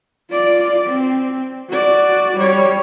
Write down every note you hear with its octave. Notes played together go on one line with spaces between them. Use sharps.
F4 D5
C4
F#4 D5
G3 C#5